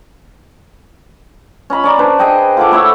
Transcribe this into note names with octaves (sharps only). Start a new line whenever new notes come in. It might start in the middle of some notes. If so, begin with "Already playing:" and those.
C#4 D#5 B5
C#4 D5 A#5
D4 B4 C5
G#4 D#5 G5
F4 A4 F#5 D6
A3 E4 C#5 E5